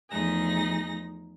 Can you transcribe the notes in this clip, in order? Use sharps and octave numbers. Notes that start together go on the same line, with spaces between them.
E2 F3 A3 D#4 G#4 A#6